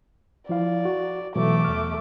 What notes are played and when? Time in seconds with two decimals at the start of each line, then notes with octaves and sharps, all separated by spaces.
0.49 F3 E4 D5 F5
0.85 F#4
1.36 B2 E3 F#3 A3 D6
1.64 E2 F6